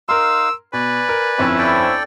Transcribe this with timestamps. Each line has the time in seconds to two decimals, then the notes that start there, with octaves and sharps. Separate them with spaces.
0.09 D#4 A#4 F5 C6 E6
0.73 B2 B4 D5 G#5
1.09 A#4
1.38 G1 F2 C4 C#4 E4
1.58 A4 D5 G5